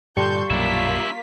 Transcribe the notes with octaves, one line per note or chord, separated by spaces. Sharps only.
G2 A#2 D3 G3 A4 C6 C#6 G6
B1 F#2 A#2 A#3 D4 E4 F4 B6